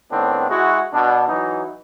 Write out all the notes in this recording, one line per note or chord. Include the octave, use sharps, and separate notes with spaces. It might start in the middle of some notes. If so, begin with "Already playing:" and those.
A2 D#3 B3 C4 D4
G#3 E4 F#4
B2 D4
E3 F#3 D#4